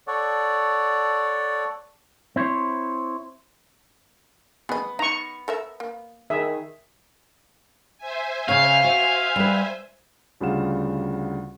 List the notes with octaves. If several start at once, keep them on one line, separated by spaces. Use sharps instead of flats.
A4 C#5 D5 F#5
C4 E4 C5 C#5
B3 G#4 D#5
D#4 A#5 C#6
A4 A#4 E5
A#3
D#3 G#4 E5
C5 E5 G#5
C#3 C#5 F5
F#4
G3 B4
D2 C#3 G3 F4 F#5 E7